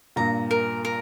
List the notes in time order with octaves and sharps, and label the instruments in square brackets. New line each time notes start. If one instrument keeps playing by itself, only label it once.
[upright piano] G2 A#2 [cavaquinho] A#5
[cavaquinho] A#4
A#4